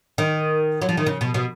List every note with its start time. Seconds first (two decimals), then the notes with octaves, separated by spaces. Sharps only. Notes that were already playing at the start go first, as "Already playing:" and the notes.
0.18 D#3
0.82 F#3
0.89 F3
0.97 D#3
1.06 C#3
1.21 B2
1.34 B2